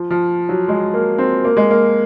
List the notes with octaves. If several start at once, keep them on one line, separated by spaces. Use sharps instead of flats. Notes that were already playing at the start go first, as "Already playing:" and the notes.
Already playing: F3
F3
F#3
G#3
A#3
C4
A#3
G#3
A#3